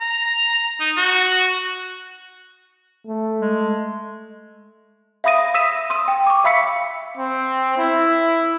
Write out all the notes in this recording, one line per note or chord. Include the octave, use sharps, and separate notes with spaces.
A#5
D#4
F#4
A3
G#3
E5 F5 B5 D#6 A#6 D#7
D#6 E6 A#6 B6 D#7 E7
C6 D#6 E6 D#7
G5
C#6 D6
E5 F5 B5 E6 B6 C#7
C4
E4